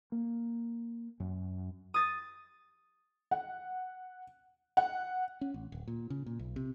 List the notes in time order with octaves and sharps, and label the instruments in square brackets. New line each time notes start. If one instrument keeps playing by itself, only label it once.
[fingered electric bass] A#3
F#2
[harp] D#6 A6
[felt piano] F#5
F#5
[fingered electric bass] C#4
A1
D1
A#2
C#3
A#2
B1
C3